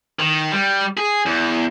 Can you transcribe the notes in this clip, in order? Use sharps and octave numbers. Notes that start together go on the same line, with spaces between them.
D#3
G3
G#4
E2